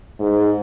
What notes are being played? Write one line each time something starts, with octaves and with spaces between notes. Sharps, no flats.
G#2